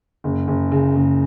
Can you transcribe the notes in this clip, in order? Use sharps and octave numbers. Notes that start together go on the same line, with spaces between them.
F#1
F#1
C#3
F#1